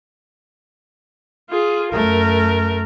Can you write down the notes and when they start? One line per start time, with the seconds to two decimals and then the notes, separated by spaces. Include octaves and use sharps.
1.50 F4 G#4
1.92 F#2 A3 A#4